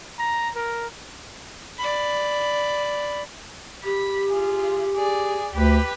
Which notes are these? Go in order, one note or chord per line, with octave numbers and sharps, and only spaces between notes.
A#5
A#4
D5 B5
G4 B5
F4 G#4
G#4 D5
D2 G4 B4